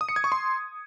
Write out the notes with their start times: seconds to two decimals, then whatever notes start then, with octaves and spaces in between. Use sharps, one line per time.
0.01 D#6
0.09 C#7
0.16 G#6
0.24 C#6
0.32 C6